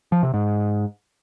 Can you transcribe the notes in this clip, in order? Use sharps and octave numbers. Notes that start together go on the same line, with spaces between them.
F3
C3
G#2